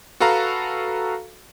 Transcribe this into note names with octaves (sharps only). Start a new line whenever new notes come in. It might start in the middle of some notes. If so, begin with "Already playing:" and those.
F#4 A4 B4 F5 A#5